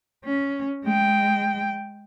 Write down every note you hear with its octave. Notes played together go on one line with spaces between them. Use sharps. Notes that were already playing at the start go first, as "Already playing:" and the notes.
C#4
G#3 G5